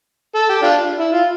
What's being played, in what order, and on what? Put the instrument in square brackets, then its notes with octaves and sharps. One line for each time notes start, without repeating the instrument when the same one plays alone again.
[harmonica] A4
G4
D4 F4
E4
F4